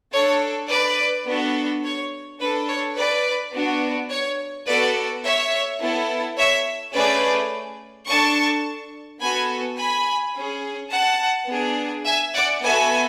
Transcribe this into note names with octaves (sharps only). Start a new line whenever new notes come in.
D4 A4 C#5
B4 D5
B3 D4 F#4 A4
C#5
D4 A4 B4
C#5
B4 D5
B3 D4 F#4
C#5
B3 F#4 A4 B4 D5
C#5 E5
B3 E4 A4
C#5 E5
A3 C#4 G#4 B4 D5
D4 A4 A5 C#6
B3 F#4 A4 G#5 B5
G#5 B5
C#4 G#4
F#5 A5
B3 D4 G#4
E5 G#5
D5 F#5
B3 F#4 A4 E5 G#5